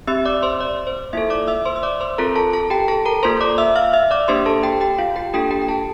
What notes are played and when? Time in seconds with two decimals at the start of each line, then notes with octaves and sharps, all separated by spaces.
0.07 C4 G4 E5 E6
0.25 D5 D6
0.42 C5 C6
0.60 D5
0.87 C5
1.13 A#3 E4 F4 A4 E5
1.30 D5 D6
1.47 E5 E6
1.65 C5 C6
1.76 E6
1.83 D5 D6
2.01 C5 C6
2.18 C4 F4 A4 A#4 A#5
2.36 A4 A5
2.53 A4 A5
2.70 G4 G5
2.88 A4 A5
3.05 A#4 A#5
3.23 A#3 F4 A4 C5 C6
3.41 D5 D6
3.58 E5 E6
3.76 F5 F6
3.93 E5 E6
4.11 D5 D6
4.28 A#3 D4 G4 C5 C6
4.46 A4 A5
4.63 G4 G5
4.81 G4 G5
4.98 F4 F5
5.16 G4 G5
5.34 A#3 D4 F4 G4 A4 G5
5.51 G4 G5
5.62 G5
5.68 A4 A5